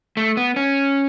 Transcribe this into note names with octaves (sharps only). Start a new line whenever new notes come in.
A3
B3
C#4